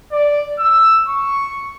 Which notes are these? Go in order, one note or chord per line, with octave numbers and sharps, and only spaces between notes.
D5
E6
C#6